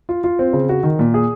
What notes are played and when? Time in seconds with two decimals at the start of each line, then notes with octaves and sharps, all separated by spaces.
0.09 F4
0.24 F4
0.39 C4
0.53 C#3
0.69 F#4
0.83 D#3
0.99 A#2
1.14 G#4